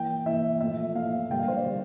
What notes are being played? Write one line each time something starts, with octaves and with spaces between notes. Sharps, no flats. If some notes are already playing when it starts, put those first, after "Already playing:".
Already playing: E3 A#3 G5
E3 A#3 E5
A#2 F3 A3 E5
A#2 F3 A3 F5
D3 G3 A#3 G5
F5
C5
D5
D3 G3 A#3